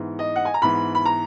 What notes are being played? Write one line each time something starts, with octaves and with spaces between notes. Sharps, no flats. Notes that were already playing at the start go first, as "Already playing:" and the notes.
Already playing: G#2 E3 B3
D#5
F#5
G#5
A#5
G#2 E3 B3 B5
B5
A#5